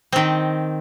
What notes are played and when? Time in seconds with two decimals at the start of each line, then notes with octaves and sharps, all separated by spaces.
0.12 D#3 C4